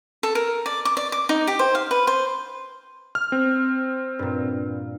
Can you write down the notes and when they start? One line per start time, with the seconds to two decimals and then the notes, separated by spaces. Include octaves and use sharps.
0.23 A4
0.35 A#4
0.66 D5
0.85 D6
0.97 D5
1.12 D6
1.29 D#4
1.47 G4
1.59 C5
1.75 F5
1.91 B4
2.07 C5
3.15 F6
3.32 C4
4.19 G2 A#2